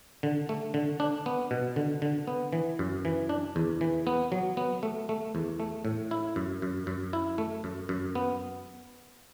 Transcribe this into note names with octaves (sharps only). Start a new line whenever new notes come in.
D3
A3
D3
D4
B3
B2
D3
D3
B3
E3
F#2
E3
D4
E2
E3
B3
F#3
B3
A3
A3
E2
A3
A2
E4
F#2
F#2
F#2
E4
A3
F#2
F#2
B3